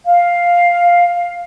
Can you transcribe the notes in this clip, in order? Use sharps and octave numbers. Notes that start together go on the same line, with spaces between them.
F5